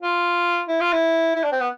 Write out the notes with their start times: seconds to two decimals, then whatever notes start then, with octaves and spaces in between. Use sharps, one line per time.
0.02 F4
0.68 E4
0.81 F4
0.93 E4
1.36 E4
1.44 D4
1.52 C4
1.61 B3